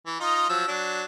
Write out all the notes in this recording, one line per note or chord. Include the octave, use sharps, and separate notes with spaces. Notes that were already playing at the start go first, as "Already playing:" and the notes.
E3
D#4 F4 D#5
F3 F#3 E6
F#3 D4